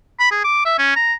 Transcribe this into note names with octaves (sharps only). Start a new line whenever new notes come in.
B5
G#4
D6
E5
C#4
A#5